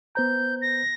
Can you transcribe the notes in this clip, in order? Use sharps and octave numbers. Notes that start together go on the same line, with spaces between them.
B3 C5 A#5 G6
A#6